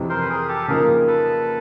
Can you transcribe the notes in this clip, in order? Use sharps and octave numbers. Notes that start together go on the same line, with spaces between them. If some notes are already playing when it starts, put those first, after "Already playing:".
Already playing: F2 C3 E3
A#4 C5
B4
G#4 A#4
G4 A4
C#3 F3 A#3 D#4 G#4 A#4
A4 B4